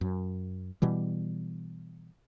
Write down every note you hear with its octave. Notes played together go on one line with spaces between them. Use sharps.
F#2
B2 E3 G3